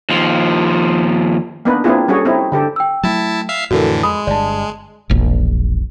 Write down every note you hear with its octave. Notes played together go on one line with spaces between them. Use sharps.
D#2 F3
A#3 B3 D4 D#4 B4
A#3 C4 D4 E4 F4 G#4
G3 C#4 F#4 G#4 A4 C#5
C4 D#4 E4
D3 G4 A4
G5 E6
F#3 A3 E4 A5
E5 F5 C7
F2 A2 D3 E3 F#4 A4 A#4
G#3 B5 D#6
G1 G2 D5 A5
E1 A#1